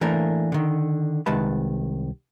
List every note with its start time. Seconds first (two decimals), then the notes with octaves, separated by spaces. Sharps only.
0.01 E3 A3 A#3 D4 A#4
0.52 D3 D#3
1.26 C2 D#3 G#3 B4 A5 B5